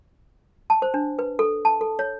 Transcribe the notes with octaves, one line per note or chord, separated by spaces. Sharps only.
A5
C5
D4
B4
A4
A5
A4
C#5